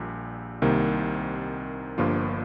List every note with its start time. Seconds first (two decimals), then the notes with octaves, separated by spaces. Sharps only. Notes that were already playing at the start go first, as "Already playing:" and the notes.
Already playing: A#1 A#2 G3
0.62 C2 C3 D#3 A#3
1.98 G1 G2 F3 A#3 F4